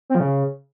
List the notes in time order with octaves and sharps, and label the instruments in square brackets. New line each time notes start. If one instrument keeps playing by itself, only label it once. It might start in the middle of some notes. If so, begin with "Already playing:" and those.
[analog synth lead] C4
F3
C#3